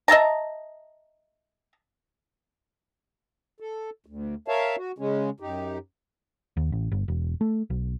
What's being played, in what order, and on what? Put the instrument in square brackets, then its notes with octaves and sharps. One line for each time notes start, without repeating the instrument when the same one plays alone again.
[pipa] D#5 E5 A5 A#5
[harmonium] A4
D2
A#4 C#5 E5 F5 A5
F#4
C#3 G#3 C#4
F#2 D#4 G4
[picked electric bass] D#2
A1
G1
E1
A3
B1